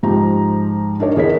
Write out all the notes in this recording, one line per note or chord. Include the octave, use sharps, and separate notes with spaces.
G#2 F3 G4 A#5
D4 D#4 A#4 C#5
E2 G#4 A#4 C#5 D#5 B6